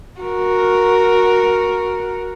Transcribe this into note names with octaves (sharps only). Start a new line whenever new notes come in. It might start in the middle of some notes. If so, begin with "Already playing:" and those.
F#4 A#4